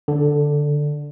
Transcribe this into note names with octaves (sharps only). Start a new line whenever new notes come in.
D3